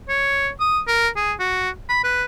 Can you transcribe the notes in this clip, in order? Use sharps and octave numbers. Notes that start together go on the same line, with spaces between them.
C#5
D#6
A#4
G#4
F#4
B5
B4